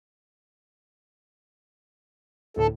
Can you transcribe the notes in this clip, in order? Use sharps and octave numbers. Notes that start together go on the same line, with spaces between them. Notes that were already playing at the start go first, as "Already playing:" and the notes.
D2 A2 A4